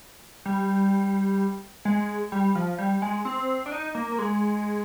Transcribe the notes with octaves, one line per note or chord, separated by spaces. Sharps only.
G3
G#3
G3
F3
G3
G#3
C4
D4
D#4
A#3
A#3
G#3